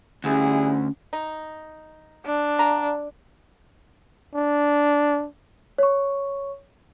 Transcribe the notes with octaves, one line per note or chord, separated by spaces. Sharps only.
D2 G3 C#4 E4 G#4
D#4
D4
D3 A#5
D4
C#5 C#6